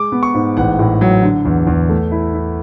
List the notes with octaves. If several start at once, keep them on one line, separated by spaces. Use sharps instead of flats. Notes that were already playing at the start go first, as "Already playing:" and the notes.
Already playing: G#3 D6
B3
C#6
G#2
A1 F#5
A2
F#3
D3
E2
E2
A3
E4
E4